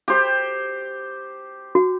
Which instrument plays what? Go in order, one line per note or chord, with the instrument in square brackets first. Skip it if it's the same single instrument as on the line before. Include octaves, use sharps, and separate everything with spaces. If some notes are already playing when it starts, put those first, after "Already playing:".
[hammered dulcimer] G4 C5
[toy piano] F#4